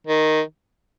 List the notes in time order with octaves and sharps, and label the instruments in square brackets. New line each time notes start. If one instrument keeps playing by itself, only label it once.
[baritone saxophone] D#3